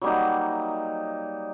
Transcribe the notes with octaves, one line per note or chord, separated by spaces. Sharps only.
F#3 G3 A#3 D#4